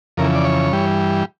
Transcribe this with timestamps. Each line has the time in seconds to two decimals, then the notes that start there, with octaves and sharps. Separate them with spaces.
0.17 F2 C#3 E3 A#4
0.35 D5
0.45 C#5
0.73 G2 E3 G3